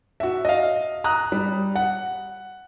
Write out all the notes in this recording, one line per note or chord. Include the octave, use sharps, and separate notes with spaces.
F#4 E5
D#5 F5
A#5 D#6 F#6
G3
F#5